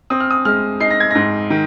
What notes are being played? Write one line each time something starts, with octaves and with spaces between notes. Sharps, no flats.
C4 D#6
F6
D#6
G#3 F6
D#4 C7
A#6
G#6
G#2 A#6
D#3